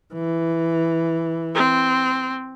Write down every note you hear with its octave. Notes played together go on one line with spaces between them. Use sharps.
E3
C4